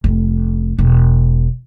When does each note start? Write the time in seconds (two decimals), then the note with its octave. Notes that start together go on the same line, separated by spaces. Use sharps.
0.04 F1
0.78 E1